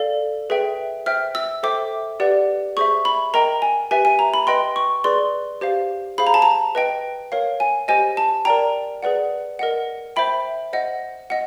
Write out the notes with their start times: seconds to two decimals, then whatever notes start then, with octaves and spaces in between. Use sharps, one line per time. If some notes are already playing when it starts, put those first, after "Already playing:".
Already playing: A4 D5 F5
0.50 G#4 B4 E5 G5
1.06 C5 E5 G5 F6
1.35 E6
1.63 A4 C5 E5 G5 D6
2.20 G4 B4 D5 F#5
2.77 G#4 C5 E5 C#6
3.05 B5
3.34 A#4 D#5 G5 A#5
3.62 G#5
3.91 G4 B4 E5 G#5
4.05 G#5
4.19 A#5
4.34 B5
4.47 B4 D#5 G5 C6
4.76 C#6
5.04 G#4 B4 D5 C6
5.61 G4 C5 F5
6.18 G#4 C5 F5 B5
6.27 A#5
6.34 A5
6.42 A#5
6.75 B4 D#5 G5
7.32 A#4 C#5 F5
7.60 G#5
7.88 G4 C5 D#5 G#5
8.17 A5
8.45 A#4 D5 G5 A#5
9.03 G#4 B4 D5 F#5
9.59 A#4 D#5 F#5
10.16 C5 E5 G5 B5
10.73 C5 D#5 F#5
11.30 D#5 F#5